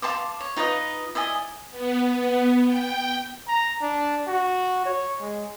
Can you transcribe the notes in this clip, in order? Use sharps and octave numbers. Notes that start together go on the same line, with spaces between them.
F5 A5 C6 D6
C#5
D#4 F4 B4 D#5
E4 D5 D#5 G#5
B3
B3
G5
A#5
D4
F#4
C#5
G#3